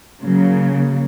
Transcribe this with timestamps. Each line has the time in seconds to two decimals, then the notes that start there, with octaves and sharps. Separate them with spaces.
0.25 C#3 F#3 A#3